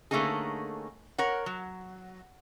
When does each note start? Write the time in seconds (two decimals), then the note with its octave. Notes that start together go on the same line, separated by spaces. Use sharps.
0.11 D3 A3 A#3 C#4 D#4 G#4
1.18 A#4 C#5 F#5
1.46 F#3